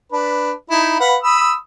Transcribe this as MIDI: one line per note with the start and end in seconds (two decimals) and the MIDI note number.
0.12 0.51 62
0.12 0.51 71
0.70 0.95 63
0.70 0.95 64
1.00 1.16 71
1.00 1.16 77
1.00 1.16 78
1.23 1.53 83
1.23 1.53 87
1.23 1.53 88